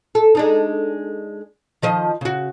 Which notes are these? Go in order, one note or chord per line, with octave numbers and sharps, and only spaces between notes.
A4
G#3 D4 D#4
D#3 F3 D#5
C#3 F#4